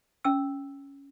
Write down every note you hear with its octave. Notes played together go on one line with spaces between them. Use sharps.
C#4 E6